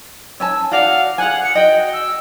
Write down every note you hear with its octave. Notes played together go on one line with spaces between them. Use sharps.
C#4 G#5 A5 E6
F#4 D5 F5 F#5
G#4 F#5 G#5
C#7
F#4 D#5 G5
E6